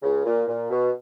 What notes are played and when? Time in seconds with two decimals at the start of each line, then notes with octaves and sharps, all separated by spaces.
0.03 C#2 C#3
0.26 A#2
0.48 A#2
0.71 B2